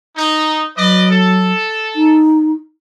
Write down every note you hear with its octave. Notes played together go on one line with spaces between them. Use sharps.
D#4
F#3 B4 D5 D#5
A4
D#4